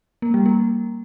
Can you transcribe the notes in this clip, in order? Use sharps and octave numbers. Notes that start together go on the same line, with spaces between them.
A#3
G3
A#3